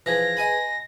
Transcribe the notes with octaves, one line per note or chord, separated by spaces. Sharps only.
E3 F3 G#4 B4 A#6
D#5 G#5 B5